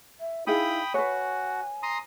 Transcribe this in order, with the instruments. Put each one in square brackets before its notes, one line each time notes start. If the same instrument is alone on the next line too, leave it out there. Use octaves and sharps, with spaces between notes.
[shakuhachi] E5
[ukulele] D#4 G#4 F5 [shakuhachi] E4 [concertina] G5 B5 D#6
[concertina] F#4 [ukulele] B4 C#5 [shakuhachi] G#5
[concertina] A#5 C6 D#6